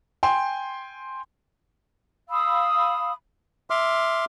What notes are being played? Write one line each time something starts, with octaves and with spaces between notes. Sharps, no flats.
G5 G#5 C6
F5 B5 D#6 E6
E5 C6 D6 F6